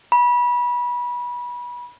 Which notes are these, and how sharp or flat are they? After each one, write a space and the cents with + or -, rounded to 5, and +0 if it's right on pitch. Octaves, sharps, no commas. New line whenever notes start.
B5 -25